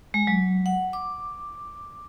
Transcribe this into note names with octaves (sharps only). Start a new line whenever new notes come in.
G#3
F#3
F#5
D6